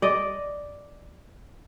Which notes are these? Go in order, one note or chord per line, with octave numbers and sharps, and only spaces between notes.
D5 D#5